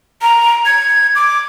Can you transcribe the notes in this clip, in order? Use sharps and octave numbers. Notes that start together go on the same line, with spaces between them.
A#5
G#6
D6